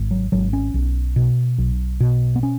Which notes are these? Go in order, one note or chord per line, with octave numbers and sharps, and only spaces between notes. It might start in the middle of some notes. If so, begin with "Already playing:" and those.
Already playing: G#1
F#3
G#1 F#3
C#4
B1
B2
B1
B2
B3
C#4